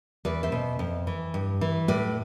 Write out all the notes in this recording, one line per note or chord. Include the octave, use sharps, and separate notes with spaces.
E2 B4 D5
C5 E5
B2
F2
E3
G2
E3
A2 B4 D5